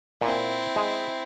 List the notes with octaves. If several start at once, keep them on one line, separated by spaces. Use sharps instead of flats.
A#2 C4 E4
G#3